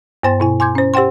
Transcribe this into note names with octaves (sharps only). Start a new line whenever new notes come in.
G2 B3 C5 G5 C6 A6
B2 E4 G#5
G#5 C6 D6 G6 G#6
C#4 C5
G4 C5 F#5 G5 C6